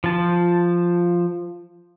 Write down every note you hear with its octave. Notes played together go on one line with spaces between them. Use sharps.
F3 A5